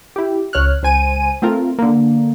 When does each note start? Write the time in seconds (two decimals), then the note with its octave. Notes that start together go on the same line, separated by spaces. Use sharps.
0.16 E4 G4
0.53 C#2 C#5 F6 F#6
0.83 C#2 C5 G#5 D#7
1.42 A3 C4 F4 A#4
1.79 D3 A#3